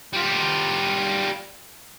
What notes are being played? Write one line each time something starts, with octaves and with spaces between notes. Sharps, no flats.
G3 F4